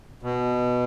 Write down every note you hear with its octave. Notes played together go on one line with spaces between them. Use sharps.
B2